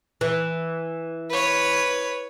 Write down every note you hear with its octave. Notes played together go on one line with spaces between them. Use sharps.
E3
B4 C#5